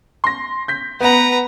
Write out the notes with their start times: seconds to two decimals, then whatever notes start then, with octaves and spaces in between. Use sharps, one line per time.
0.24 C6 A#6
0.68 G6 B6
1.00 B3 B4 F#5 A#5